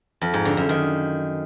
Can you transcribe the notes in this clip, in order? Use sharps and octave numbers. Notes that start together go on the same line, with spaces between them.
F2
G#2
D3
F#2
D#3